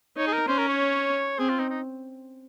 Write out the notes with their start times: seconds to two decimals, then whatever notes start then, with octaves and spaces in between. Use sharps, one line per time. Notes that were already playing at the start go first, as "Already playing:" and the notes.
0.17 D#4 C#5
0.27 G#4
0.33 A#4
0.48 C#4 C5
0.58 A#4
0.68 C#5
1.39 C4 G#4
1.49 F4
1.59 D#4
1.69 D#4